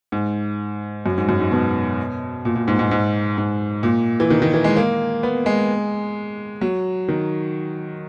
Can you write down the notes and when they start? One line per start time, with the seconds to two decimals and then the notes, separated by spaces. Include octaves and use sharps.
0.12 G#2
1.06 F#2
1.18 G#2
1.29 F#2
1.40 G#2
1.51 B2
2.45 A#2
2.55 A#2
2.68 G#2
2.79 G#2
2.91 G#2
3.38 G#2
3.83 A#2
4.20 E3
4.30 D#3
4.42 D#3
4.54 E3
4.64 G#3
4.76 A#3
5.23 B3
5.46 G#3
6.61 F#3
7.08 D#3